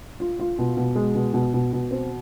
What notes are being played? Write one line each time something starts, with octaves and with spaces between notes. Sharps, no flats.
F4
F4
B2
B2
G#3
B2
B2
B2
B2
C4